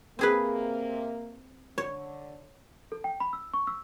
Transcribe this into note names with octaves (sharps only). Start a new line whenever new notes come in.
C3 A#3 C4 G#4 B4
D3 C#5
A4
G5
B5
E6
C#6
E6